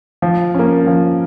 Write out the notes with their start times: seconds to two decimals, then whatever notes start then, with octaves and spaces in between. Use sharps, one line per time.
0.22 F3
0.54 A#3 C#4
0.87 F3